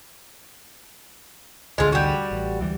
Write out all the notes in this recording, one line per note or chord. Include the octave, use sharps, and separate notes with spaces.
A1 D2 D3 G#3 F4
G3 F#4
A1
D2 E3 G3